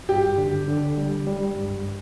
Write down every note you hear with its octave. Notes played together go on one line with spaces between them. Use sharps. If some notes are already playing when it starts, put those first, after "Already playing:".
G2 G4
D3
D3
G3
G3
G2